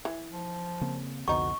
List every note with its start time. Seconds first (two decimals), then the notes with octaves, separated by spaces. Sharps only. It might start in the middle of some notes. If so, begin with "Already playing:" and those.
0.05 E3
0.31 F3
0.81 C#3 A#3 C4
1.28 C2 F2 D3 B3 D#4 F#4 C#6